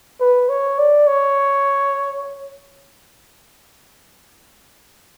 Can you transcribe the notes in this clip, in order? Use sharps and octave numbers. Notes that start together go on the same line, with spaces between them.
B4
C#5
D5
C#5